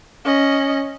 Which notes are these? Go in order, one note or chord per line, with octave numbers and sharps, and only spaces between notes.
C#4 D#5